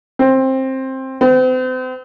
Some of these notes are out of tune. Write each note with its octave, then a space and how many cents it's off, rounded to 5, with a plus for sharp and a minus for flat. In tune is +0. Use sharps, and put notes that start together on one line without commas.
C4 +15
C4 -40